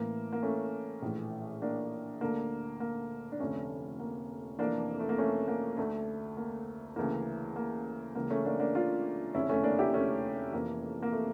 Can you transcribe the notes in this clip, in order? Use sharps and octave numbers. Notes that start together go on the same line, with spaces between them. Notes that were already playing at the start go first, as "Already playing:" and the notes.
Already playing: A1 A2 E3 A#3
A#3
A3 C#4
A#1 A2 E3
A#3 D4
D2 D3 A#3
A#3
D4
F1 F2 D3 A3 C#4
A#3
F1 F2 E3 A#3 D4
A3
A#3
A3 C#4
A#3
D2 D3 A3
A#3
D2 C#3 E3 A#3
A#3
C#2 C#3 E3 A#3
A3 C#4
A#3 D4
A#3 D4
D4 F4
F1 E2 D3 C#4 E4
A3 C#4
A#3 D4
E4 G4
A3 C#4
F1 F2 E3 A#3
A#3
A3